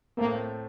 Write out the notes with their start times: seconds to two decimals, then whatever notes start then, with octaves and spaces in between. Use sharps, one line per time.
0.17 A2 A3 A#3 C4